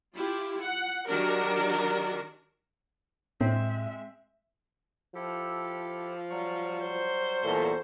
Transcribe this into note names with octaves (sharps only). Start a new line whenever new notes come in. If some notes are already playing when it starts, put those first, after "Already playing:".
E4 F4 G4
F#5
D#3 F#3 D4 F#4 G4 A#4
A2 G#3 C4 E5
F3 E4 G4 A4
F#3 G3 C#6
C5
E2 A#2 A4